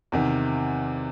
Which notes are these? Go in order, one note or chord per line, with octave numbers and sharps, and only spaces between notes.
E2 C3 D#3